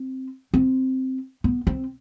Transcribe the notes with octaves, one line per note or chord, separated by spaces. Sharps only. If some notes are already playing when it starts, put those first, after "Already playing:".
Already playing: C4
C4
B3
C4